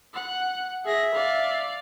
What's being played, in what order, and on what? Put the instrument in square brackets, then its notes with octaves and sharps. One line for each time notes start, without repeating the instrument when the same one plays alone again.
[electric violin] F#5
[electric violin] G#4 A#6 [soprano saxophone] E5
[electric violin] D5 F5